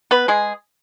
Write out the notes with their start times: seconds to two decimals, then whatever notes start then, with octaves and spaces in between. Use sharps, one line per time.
0.11 B3 B4
0.28 G#3 G#4